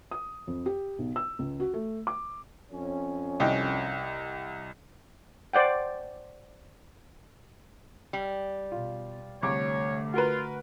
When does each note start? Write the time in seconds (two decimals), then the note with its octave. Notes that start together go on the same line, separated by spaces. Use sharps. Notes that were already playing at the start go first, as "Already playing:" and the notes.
0.11 D#6
0.47 F2
0.66 G4
0.99 B1
1.16 E6
1.39 C#2
1.60 F#4
1.74 A3
2.07 D6
2.72 F2 C#4
3.40 C2 D#5 G5
5.53 C5 D5 F#5 G5
8.13 G3
8.72 B2 F4
9.42 C2 D3 A3 C#5 D6
10.14 F4 F#4 A#4 B4